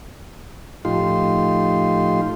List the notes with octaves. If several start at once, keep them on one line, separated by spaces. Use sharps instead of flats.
A2 F3 D#4 F4 G4 C6